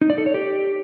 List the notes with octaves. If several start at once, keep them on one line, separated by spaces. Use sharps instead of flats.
D#4
D5
A4
C#5
G4